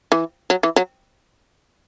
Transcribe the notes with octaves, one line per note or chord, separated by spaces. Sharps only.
E3
F#3
E3
F#3